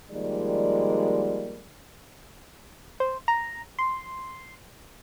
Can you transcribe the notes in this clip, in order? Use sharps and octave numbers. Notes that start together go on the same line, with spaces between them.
D#3 F3 G3 G#3 A#3 D5
C5
A#5
C6